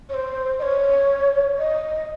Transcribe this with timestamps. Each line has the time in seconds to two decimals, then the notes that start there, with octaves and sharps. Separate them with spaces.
0.09 C#5
0.14 C5
0.59 D#5
0.62 C#5
1.58 D#5